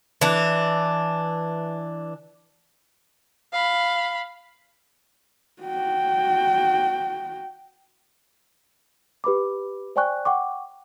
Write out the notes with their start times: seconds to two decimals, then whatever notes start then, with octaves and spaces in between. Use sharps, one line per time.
0.21 E3 D4
3.53 F5 B5
5.62 F#4 G5
9.24 G4 B4 B5 D6
9.96 C5 D5 G5 G#5 C#6 F#6
10.25 F#5 G5 C#6 D6